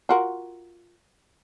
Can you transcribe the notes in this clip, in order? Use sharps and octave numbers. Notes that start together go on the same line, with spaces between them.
F4 F#4 A#4